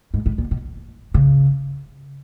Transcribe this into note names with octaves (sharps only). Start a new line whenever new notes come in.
G#2
A2
A#2
B2
C#3